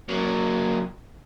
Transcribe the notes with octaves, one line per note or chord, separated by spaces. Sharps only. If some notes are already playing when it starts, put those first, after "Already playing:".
F#3 A#3